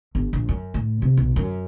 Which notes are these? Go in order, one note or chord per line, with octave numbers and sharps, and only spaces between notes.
G1
A#1
F#2
A2
C3
B1
F#2